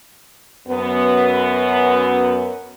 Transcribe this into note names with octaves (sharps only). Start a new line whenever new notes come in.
F#2 B3